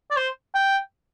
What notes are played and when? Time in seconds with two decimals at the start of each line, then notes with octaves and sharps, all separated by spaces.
0.11 D5
0.17 C5
0.55 G5